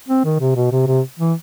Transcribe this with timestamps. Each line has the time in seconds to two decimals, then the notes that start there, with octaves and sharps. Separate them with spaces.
0.08 C4
0.24 D#3
0.40 C3
0.56 B2
0.72 C3
0.87 C3
1.19 E3